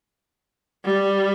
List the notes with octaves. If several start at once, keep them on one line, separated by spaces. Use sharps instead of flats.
G3